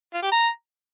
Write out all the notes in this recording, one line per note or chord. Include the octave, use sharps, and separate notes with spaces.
F4
G4
A#5